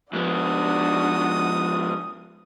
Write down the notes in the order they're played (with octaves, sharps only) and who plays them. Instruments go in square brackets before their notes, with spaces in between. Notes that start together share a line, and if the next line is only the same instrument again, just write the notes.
[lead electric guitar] G#2 B3 [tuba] F3 [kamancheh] D4 F#4 [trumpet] D#6